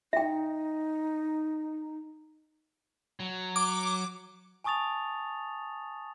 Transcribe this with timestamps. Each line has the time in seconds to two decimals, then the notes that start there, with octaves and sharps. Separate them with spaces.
0.13 D#4 E5 G5
3.20 F#3
3.56 D6
4.64 G#5 A5 C#6 D#6 A6 F7